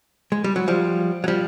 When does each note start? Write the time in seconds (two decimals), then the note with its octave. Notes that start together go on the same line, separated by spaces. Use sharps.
0.32 G#3
0.44 G3
0.56 F#3
0.68 F3 G3
1.24 F#3
1.28 F3 G3